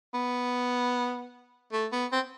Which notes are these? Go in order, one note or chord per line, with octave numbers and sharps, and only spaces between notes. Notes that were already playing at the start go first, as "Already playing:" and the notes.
B3
A3
B3
C4